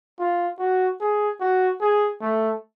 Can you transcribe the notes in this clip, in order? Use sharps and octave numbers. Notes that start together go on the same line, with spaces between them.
F4
F#4
G#4
F#4
G#4
A3